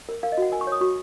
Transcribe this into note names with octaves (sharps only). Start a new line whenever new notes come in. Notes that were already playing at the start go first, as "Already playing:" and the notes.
A#4
A#4 F5
D#5
F#4 F#5
A#4 G#5
C#6
C#5 D#6
F#4 C#6